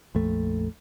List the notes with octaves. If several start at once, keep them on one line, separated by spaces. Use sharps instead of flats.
A#1 F2 A3